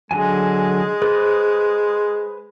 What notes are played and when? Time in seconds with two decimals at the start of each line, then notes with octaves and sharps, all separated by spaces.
0.11 D3 F#3 G#3 G#5
1.02 G#4 B4 C5